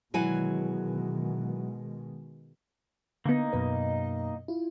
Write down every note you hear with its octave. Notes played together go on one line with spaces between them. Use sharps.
B2 D#3 E3 F#3 G#3 G#5
D3 A#3 B3 D#4
F#2 B2 B4 D#5
E4 F4